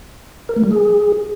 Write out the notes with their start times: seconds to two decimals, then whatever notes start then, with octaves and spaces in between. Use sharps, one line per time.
0.49 A#4
0.56 A3
0.64 G3
0.71 G#4